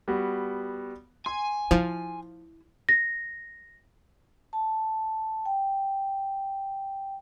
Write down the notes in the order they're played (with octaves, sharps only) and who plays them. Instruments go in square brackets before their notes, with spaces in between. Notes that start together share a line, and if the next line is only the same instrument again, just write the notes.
[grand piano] G3 B3 F#4
[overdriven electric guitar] G#5 [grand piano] C6
[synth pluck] F3 [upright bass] E4
[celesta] A#6
[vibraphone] A5
G5